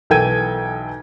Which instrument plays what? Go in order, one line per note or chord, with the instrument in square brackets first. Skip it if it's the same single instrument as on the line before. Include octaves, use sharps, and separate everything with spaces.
[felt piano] B1 E3 A4 G5 G#6 D#7